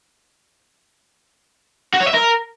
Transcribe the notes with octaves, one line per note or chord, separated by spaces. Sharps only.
F#4
C#5
E5
A#4